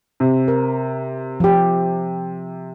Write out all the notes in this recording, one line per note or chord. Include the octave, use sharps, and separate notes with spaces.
C3
A#4
F3 G4